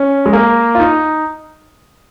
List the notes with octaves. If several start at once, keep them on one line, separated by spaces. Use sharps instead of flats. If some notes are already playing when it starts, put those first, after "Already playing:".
Already playing: C#4
G#3
A#3
F4
D#4